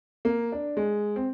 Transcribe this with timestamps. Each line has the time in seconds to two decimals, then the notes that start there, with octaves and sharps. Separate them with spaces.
0.25 A#3
0.52 D4
0.77 G#3
1.16 C4